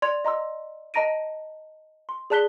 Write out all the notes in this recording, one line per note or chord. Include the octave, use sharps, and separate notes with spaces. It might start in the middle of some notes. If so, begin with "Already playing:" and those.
D5 C6 G#6 F7
D#5 A#5 C6 E6
D#5 A5 A#5 A#6 D7 D#7
C6
G#4 D5 A5 F#6 B6 G7